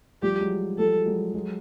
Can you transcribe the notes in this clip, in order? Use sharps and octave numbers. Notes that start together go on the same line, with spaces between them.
F3 G3 G4
F#3 G#3
F3 G3 A4
F#3 G#3
F#3 G#3